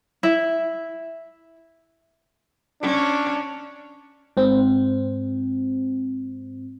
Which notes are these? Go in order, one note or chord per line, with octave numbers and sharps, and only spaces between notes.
E4 E5
C#4 D4
G#2 C4